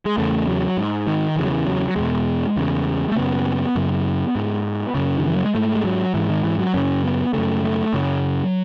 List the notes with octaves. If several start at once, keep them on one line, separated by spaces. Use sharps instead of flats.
G#3
E2 C#3 A3
F#3
G#2
D#3
E2 C#3 E3
F#3
E3
F#3
F#3
E2 B2 G#3
E2 C#3
A3
F#2 C#3 B3
F#2 C#3
G#2
F#2 C#3
D#3
E3
F#3
G#3
G#2 A3
G#3
F#3
G#2 E3
D#3
E3
F#3
F#2 C#3 C#4
B3
F#2 C#3 A3
A3
F#2 C#3 F#3